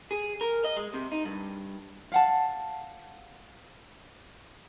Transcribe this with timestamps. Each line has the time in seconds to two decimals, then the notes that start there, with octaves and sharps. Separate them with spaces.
0.11 G#4
0.41 A#4
0.64 D#5
0.77 G#3
0.94 C3
1.12 D#4
1.25 G2
2.12 F5 F#5 A5